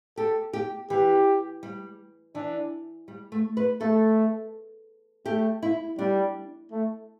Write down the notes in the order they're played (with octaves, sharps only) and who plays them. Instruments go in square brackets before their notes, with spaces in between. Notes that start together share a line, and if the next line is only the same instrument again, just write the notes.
[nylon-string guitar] G4 [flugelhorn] A4
[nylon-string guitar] G4
[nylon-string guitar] E3 [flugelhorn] G4
[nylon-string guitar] G3
[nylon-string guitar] E3 [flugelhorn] D4
[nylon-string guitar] G3
A3
B4
[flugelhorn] A3 [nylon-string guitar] A4
[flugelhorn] A3 [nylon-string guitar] G4
[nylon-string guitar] E4
[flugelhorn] G3 [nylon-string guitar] D4
[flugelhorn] A3